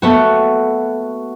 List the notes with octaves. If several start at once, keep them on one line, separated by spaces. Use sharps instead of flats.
A3 B3 F#4